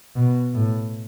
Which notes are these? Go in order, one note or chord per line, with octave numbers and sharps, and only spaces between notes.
B2
A2